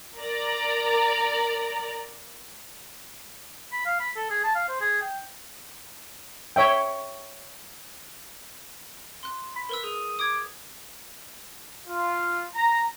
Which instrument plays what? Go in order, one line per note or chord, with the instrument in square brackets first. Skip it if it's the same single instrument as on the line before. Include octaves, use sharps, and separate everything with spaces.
[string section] A#4 D5 A#5
[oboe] B5
F5
B5
A4
G#4
A5
F5
C5
G#4
G5
[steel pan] C#5 E5 G5
[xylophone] C6 F#6
[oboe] B5
[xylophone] A#4 B4 E6
[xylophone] G#4 [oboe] D#6
[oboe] D6 [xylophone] D#6 G#6
[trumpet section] F4
A#5